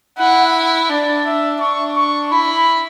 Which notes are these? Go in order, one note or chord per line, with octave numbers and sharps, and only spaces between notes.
E4 F#5
D4 D5
E5
D4 C#6
C#6
E4 B5